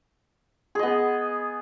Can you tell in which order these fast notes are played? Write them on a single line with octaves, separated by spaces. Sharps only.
G#4 D#5 B3